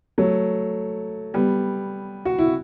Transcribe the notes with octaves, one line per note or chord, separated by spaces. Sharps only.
F#3 A3
G3 B3
F#4
E4